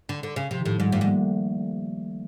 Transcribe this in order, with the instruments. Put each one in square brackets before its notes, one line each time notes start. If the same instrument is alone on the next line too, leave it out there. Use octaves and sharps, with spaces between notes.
[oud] D3
D3
C#3
[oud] C3 [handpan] F3
[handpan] D#3
[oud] A2 [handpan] F3
[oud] G#2 [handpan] G3
[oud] G2 [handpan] A3
[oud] G#2
[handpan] A#3